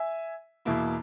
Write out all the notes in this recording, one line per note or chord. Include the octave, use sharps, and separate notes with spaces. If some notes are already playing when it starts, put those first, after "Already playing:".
Already playing: E5 G#5
E2 B2 A#3 E4